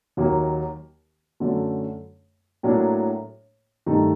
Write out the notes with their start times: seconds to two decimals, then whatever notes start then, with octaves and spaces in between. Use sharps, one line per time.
0.17 D#2 D#3 F#3 A#3
1.40 F#2 D3 F#3 A3
2.63 A2 F#3 A#3 D4
3.86 G2 D#3 A3 D#4